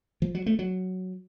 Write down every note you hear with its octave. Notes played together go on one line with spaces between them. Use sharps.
F3
F#3
A3
F#3